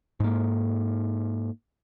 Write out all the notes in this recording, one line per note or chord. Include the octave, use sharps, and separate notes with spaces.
G#2 A#3